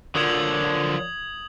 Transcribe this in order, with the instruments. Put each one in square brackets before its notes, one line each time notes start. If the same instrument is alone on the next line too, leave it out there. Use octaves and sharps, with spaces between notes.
[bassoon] A#2 [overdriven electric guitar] D3 [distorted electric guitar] F3 F#3 [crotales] D#6 G#6 F#7